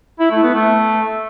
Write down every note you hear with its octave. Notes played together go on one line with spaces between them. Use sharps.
E4
A3
B3
A3